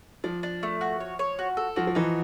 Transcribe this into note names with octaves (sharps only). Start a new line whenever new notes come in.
F3 D4
D4
A3
F#4
C#5
C#5
F#4
A4
F3 F#4
F3
E3 D#4